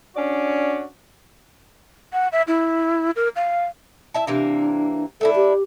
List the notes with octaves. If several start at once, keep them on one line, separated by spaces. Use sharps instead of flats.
C#4 D4 F#4 D5
F#5
E5
E4
A#4
F5
E4 E5 A5
C3 E3 A#3 D4
A3 D4 E4 A4
G4